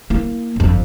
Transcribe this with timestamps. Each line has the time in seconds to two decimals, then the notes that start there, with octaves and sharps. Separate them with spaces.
0.10 A#3 E4
0.56 G1 F2